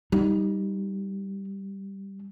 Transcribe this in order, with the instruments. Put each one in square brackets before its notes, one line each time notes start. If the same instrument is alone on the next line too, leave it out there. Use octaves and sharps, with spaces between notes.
[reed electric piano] G3 [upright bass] D#4